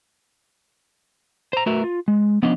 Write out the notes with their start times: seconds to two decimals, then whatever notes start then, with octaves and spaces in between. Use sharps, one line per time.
1.53 C5 A#5
1.66 A3 F#4 A#4 B4 E5
1.84 F4
2.08 G#3
2.43 F3 B3 C#4 D4 D#5